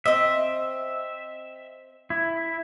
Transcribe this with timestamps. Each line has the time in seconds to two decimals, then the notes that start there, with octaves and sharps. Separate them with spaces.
0.06 C4 D#5 E5
2.10 E4